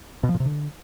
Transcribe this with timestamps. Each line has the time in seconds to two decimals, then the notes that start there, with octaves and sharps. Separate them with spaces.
0.23 B2
0.29 F3
0.34 A#2
0.40 C3
0.45 D3